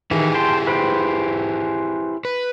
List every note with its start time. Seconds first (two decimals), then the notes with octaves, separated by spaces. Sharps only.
0.11 D#3 E3 E4 G4 G#4
0.35 G5 A5 C6
0.67 B4 C5 G5
2.25 B4